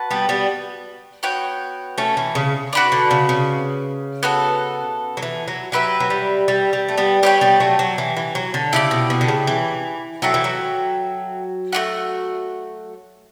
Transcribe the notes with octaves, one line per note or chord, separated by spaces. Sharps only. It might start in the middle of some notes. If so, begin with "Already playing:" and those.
Already playing: F#4 B4 A5
G3 B3
G3 B3
B3 F#4 C#5 G5
A3 C#4
E3
C#3
F#4 B4 D5
D3
C#3
C#3
B3 F#4 A4
F#3
E3
F#3
F#3 G4 B4 E5
F#3
G3
G3
G3
A3
G3 B3
G3 B3 G4 C#5 G5
G3 B3
F#3 A3
F#3
E3
E3
F#3
D3
C#3 E4 G4 D5
B2
B2
D3
C#3
E3
F#3 F#4 A4 E5 G5
E3
F#3
A3 D4 F#4